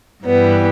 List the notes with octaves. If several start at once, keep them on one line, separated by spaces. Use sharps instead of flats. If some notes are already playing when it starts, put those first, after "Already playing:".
G2 E3 G3 B3